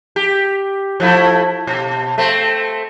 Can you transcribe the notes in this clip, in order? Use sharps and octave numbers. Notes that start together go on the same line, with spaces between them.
G4
F3 A3 E4
B2
A3 C4